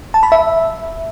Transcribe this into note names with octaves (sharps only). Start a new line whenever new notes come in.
A5
B5
E5